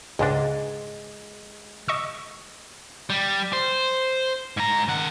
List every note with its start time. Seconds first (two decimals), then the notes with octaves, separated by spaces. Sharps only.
0.19 C#2 G#2 G#3 D4
1.88 D#5 C#6 E6
3.10 G3
3.53 C5
4.57 G#2 A#5
4.88 D#3 F#5